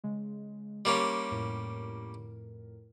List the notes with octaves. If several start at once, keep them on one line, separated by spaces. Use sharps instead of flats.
C#3 G#3
G3 A#3 C#4 C6
F2 A2 A#4